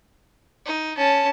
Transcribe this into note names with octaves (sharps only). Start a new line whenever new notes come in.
D#4
C#4 A5